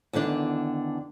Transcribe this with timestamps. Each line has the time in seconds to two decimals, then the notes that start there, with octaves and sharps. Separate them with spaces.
0.13 E2 D3 D#3 D4